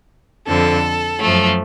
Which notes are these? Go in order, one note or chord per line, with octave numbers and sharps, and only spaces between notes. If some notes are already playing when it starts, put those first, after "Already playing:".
F2 D3 F3 A4
F#2 F3 A3